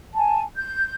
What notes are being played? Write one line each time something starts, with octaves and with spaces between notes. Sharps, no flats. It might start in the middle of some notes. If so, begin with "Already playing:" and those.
G#5 A5
G6